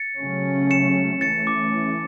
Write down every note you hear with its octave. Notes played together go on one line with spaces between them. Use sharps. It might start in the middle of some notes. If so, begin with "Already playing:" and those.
Already playing: A6 C#7
C#3 F#3 A3 C#4
C#7 E7
E3 A3 C#4 A6 C#7
D6